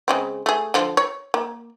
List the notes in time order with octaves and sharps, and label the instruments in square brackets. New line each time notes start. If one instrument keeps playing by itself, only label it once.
[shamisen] C#3 G#3 C4
A3 G#4
D3 F3
C#5
A#3